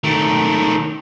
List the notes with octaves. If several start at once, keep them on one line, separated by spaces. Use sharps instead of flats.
D#3 A3